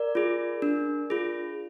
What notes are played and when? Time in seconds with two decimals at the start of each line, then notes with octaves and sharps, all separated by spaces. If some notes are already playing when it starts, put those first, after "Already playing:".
Already playing: A#4 D5
0.15 F4 G#4
0.62 D4
1.10 F4 G#4